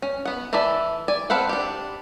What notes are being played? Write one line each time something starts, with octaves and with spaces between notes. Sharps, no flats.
C#4
B3 F#5
E3 E4 A4 D5 E5
D5 G#5
C4 A4 B4 F5 F#5
D4 G4